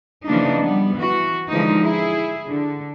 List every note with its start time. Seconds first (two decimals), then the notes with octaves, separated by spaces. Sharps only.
0.26 C#3 E3 F3 A#3 D4 D#4
0.60 G3 B3
0.96 E3 F#4
1.49 D3 E3 F3 G#3 D#4
1.84 E4 G#4
2.47 D3